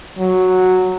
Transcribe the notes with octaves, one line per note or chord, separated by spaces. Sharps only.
F#3